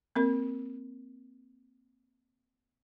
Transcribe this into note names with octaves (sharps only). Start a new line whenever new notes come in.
A#3 C4 A#4